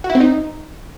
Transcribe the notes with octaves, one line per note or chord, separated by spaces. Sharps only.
F#4
E4
C4
D#4